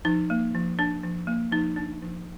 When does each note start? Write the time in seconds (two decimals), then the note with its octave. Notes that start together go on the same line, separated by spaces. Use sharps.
0.05 F3 D#4
0.30 A#3
0.54 F3
0.79 D4
1.03 F3
1.27 A#3
1.52 F3 D#4
1.76 D4
2.02 F3